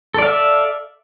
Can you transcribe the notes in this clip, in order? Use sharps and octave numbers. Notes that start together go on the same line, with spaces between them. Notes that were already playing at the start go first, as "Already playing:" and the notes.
A4 D5 E5 F5